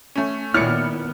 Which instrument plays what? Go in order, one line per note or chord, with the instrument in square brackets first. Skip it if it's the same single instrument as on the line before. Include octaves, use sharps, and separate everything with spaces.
[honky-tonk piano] A3 C#4
[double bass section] A#2 D#3 B3 [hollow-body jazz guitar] E4 C#5 D5 [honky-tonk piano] F6 C#7